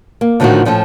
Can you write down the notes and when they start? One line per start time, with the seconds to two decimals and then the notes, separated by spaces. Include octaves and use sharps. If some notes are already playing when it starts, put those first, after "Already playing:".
0.21 A#3
0.40 A2 D3 D#3 F3 F4 F#4
0.65 A2 F3 C#4 A4